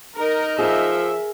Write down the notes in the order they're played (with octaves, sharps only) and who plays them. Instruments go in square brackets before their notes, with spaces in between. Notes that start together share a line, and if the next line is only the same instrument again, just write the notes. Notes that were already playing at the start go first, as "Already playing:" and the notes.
[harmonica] D#4 [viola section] A#4
[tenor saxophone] F3 [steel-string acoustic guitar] G#4 A#4 [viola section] E5